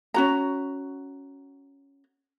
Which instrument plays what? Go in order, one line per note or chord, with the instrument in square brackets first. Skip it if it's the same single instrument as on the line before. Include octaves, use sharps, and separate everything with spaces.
[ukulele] C#4 F#4 A#5